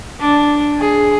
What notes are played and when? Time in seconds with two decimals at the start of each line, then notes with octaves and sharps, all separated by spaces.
0.20 D4
0.79 G#4